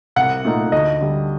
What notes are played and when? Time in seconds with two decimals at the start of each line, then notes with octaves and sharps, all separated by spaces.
0.16 C2 F#5
0.45 A#2 A3 D#4
0.72 D2 D#5
1.01 D3 G3